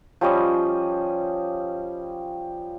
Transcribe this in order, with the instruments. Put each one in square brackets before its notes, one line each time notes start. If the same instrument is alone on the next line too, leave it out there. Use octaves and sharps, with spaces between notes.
[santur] F3 G3 C#4 D#5